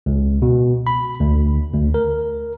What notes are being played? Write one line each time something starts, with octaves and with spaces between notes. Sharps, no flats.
C#2
B2
B5
D2
D2
A#4